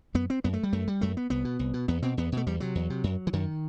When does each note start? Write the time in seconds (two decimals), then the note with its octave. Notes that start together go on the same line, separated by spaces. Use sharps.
0.14 F#2 B3
0.30 C4
0.44 F#2 B3
0.53 A3
0.63 G3
0.73 F#2 A3
0.88 G3
1.01 F#2 A3
1.17 B3
1.30 C2 B3
1.45 B2
1.59 C2
1.74 B2
1.88 E2 B3
2.02 B2 C4
2.17 E2 B3
2.32 B2 A3
2.47 E2 G3
2.60 C3 F#3
2.75 E2
2.90 C3
3.04 F#2
3.27 E3
3.33 F#2 D#3